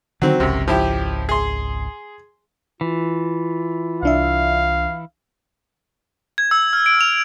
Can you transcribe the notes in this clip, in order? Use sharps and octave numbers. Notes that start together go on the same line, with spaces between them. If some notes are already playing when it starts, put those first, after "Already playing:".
D3 D#3 F#3 C4
G#1 C#2 F#2 C3
F3 E4 G4
G#4 C6
E3 F4
C2 D4 E5 F5
G#6
E6
F6
D7
F7